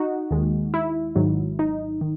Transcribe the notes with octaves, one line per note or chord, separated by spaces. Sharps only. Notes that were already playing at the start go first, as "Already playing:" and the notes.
Already playing: D#4 F#4
D#2 D#3 G#3
E4
G#1 G#2 D#3 F#3
D#4
D#3